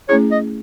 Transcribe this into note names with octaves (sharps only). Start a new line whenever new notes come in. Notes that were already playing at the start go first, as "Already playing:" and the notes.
A3 C#4 E4 G#4 C#5
D#5